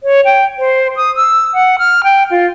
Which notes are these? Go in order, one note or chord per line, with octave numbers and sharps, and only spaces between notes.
C#5
G5
C5
D#6
E6
F#5
F6
G5
F4